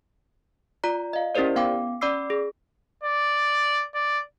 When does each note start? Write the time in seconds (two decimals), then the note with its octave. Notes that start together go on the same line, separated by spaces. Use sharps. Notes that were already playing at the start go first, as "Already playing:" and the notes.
0.84 F4 D5 A#5
1.13 D#5 F5
1.35 C#4 E4 G4 A#4 C5 D5
1.56 B3 F5 G5 D6
2.01 C#4 D5 B5 D6 E6 C7
2.30 G#4
3.04 D5
3.94 D5